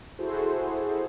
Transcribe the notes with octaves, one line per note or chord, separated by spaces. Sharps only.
E4 F#4 G#4 A4 C5